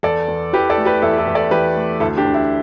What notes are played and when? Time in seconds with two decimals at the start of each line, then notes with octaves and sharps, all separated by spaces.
0.03 E2 A4 D5
0.29 E2
0.53 E3 G4 B4
0.70 A4 D5
0.77 A3
0.85 G4 B4
1.02 E2 E4 A4
1.18 E4 A4
1.27 E2
1.35 A4 D5
1.51 E3 G4 B4
1.76 A3
2.00 D2 E4 A4
2.17 D4 G4
2.25 D2
2.34 E4